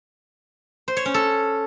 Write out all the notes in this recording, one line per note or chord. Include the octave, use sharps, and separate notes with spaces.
C5
C#5
C#4
A4